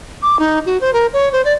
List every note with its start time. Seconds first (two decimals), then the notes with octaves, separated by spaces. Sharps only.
0.22 D6
0.39 D#4
0.66 F#4
0.81 C5
0.93 A#4
1.13 C#5
1.33 C5
1.45 D5